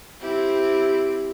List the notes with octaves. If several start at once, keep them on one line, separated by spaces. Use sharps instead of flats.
C4 E4 G4